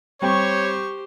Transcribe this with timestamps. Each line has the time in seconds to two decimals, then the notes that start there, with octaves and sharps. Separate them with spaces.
0.22 G3 C4 G4 C5 C#5 G5 C#6